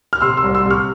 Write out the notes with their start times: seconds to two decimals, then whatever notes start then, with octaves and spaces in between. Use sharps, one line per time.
0.13 F6
0.21 C3 C6 E6
0.37 C6 E6
0.43 C2
0.55 C6 E6
0.66 C3 C#6 F6